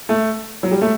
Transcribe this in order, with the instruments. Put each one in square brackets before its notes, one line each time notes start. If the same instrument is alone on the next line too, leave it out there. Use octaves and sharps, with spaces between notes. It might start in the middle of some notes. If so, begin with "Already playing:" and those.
[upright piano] A3
F#3
G3
A3